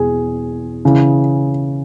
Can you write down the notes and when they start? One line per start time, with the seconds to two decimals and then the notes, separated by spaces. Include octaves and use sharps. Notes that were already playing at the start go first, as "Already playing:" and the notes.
Already playing: E2 B2 G#4
0.85 C#3 E3